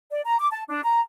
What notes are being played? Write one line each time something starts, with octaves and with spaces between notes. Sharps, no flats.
D5
A#5
D6
A5
D4
A#5